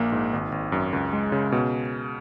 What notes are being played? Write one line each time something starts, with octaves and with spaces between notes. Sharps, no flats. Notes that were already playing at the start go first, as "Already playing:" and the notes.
Already playing: A#1 A#3
G#2
G#1
G#1
F#2
C#2
G#3
C#3
B2